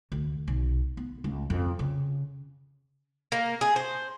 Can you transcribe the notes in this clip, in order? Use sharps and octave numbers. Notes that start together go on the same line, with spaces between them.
D2
B1
B3
C#2
F2
C#3
A#3
G#4
C5